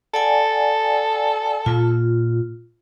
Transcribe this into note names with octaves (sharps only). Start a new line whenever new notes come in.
A4 D5 F#5 G#5
A#2 A#3 F4